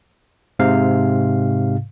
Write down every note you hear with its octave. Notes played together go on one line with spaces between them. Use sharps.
G#2 C3 F5